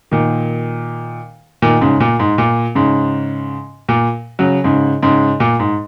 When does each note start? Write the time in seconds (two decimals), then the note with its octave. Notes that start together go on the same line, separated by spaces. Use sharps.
0.11 A#2 D#3
1.62 A#2 D#3
1.81 G#2 C#3
2.00 A#2
2.19 G#2
2.38 A#2
2.75 G#2 C#3
3.89 A#2
4.39 C#3 F#3
4.64 G#2 C#3
5.03 G#2 C#3
5.40 A#2
5.60 G#2